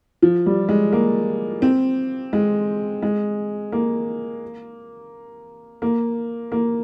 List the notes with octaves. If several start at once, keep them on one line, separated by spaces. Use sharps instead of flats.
F3
G3
G#3
A#3
C4
G#3
G#3
A#3
A#3
A#3